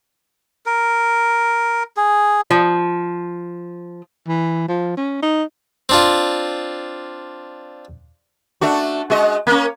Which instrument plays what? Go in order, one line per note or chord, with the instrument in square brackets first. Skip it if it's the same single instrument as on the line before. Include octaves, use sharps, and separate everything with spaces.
[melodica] A#4
G#4
[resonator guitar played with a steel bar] F3
[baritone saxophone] E3
F3
C#4
D#4
[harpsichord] C4 D4 F4
[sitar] A3 D4 F#4
G#3 F#4 D#5
A#3 C#4